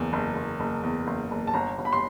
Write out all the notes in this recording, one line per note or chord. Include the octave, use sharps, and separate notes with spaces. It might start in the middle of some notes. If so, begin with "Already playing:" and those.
Already playing: F#1 E2
F#1
F#1
F#1
E2
F#1
F#1
A5
G1 A#5
G1
B5
C6